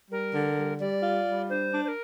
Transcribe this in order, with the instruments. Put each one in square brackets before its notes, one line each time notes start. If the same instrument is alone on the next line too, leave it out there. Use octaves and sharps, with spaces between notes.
[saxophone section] G3 [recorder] A#4
[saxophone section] D3
G3
[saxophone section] G3 [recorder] D5
[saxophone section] F4
G3
[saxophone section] D4 [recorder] C5
[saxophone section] D4
[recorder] C5
A#4